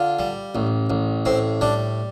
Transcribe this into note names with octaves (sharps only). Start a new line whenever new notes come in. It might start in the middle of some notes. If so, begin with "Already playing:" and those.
Already playing: D3 F4
G3
A1
A1
A2 C4
G3 D4